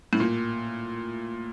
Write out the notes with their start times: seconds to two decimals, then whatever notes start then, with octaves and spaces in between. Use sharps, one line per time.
0.13 A2
0.20 A#2